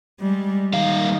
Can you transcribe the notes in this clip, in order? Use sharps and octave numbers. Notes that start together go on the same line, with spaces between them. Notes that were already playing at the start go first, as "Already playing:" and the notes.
G3 G#3
D#3 G3 A#3 F5